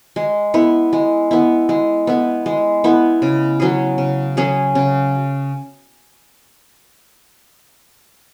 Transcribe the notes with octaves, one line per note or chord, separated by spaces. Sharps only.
G#3
B3 E4
G#3
B3 E4
G#3
B3 E4
G#3
B3 E4
C#3
F#3 C#4 G#4
C#3
F#3 C#4 G#4
C#3